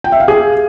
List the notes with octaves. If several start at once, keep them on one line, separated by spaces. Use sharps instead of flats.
G5
E5
F5
G#4